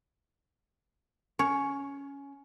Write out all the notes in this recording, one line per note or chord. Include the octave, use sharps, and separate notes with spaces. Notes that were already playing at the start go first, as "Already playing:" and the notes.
C#4 C#5